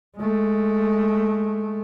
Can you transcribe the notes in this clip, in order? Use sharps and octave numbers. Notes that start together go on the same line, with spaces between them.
G#3 A3